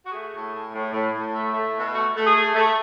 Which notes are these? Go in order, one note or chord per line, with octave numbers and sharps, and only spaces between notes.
F#4
A3 G#4
A2
A2
A2
A2
A2
A3
A3
B2
A3 F#4
A3
G#4
A3
A3